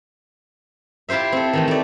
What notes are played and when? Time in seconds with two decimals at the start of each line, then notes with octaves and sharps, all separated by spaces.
1.09 E4 F4 G4 C5 E5
1.32 C4 A4
1.53 D#3 E3 A3
1.68 A3 D5